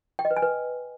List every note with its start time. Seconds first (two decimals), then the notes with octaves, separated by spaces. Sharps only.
0.19 G5
0.25 D#5
0.31 B4
0.37 G#5
0.42 B4